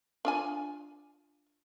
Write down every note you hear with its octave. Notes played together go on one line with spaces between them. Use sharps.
D4 F4 G#5